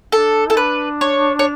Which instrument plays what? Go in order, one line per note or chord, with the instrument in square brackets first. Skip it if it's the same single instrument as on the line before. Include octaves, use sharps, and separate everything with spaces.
[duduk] D4 [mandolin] A4
[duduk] E4 [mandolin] A4
[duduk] D4 [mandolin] B4
[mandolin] C#5
C#5